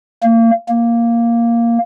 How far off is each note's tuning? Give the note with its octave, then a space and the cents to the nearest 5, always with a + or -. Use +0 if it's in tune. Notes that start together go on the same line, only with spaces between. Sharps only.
A#3 -30
A#3 +0